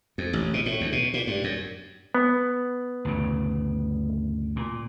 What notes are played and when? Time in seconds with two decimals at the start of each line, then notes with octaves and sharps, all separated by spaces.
0.18 F2
0.33 A1
0.54 B2
0.66 A2
0.81 D2
0.92 B2
1.14 A#2
1.27 G2
1.44 F#2
2.15 B3
3.05 D2 G2 C#3
4.56 A#2